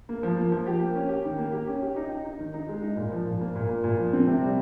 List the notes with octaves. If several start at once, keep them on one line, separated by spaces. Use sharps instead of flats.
A#3
F3
A#3
F3
G4
A#3
C#4
G4
D#3
A#3
G4
C#4
G4
D#4
D#4
D#4
D#3
D#4
G#3
D#4
A#2
F3
A#2
A#3
A#2
A#3
A#2
F3
C4
C3
G3